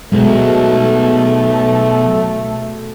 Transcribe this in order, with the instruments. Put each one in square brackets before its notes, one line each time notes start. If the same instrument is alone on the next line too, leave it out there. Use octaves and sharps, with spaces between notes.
[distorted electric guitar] B1 [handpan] B2 G#3 [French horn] A3